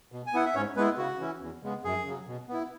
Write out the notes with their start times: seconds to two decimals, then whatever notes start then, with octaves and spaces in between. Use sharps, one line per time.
0.12 B2
0.26 G#5
0.33 B3 E4 F#5
0.45 E5
0.55 G#2 C#4 C#5
0.76 G#3 B3 E4 B4
0.98 C#3 F#4
1.20 E3 C#4 E4
1.41 E2
1.62 C#3 G#3 B3
1.84 F#2 G#4
2.05 C#3 F#3
2.27 B2
2.49 B3 E4